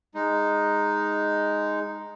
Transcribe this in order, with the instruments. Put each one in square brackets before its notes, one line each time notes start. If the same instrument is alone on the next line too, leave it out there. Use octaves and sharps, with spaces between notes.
[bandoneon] G#3 D#4